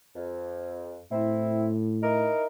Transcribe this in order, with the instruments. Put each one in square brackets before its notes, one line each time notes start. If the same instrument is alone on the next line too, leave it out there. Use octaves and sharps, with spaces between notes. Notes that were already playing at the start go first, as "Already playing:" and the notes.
[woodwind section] F2
[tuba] A2 [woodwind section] C4 E4
[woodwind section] D#4 E4 A#4